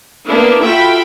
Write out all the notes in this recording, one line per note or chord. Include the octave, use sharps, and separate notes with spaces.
A#3 B3 D4 E4
F4 F#4 A4 E5 G5 B5